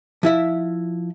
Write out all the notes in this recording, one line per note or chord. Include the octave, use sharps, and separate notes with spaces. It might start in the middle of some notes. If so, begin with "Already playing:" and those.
F3 E4 E5